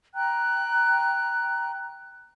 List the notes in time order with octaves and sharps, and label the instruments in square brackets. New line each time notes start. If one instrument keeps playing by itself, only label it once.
[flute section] G5 A#5 F#6